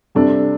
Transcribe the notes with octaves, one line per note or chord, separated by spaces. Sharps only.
C3 G3 D4 A4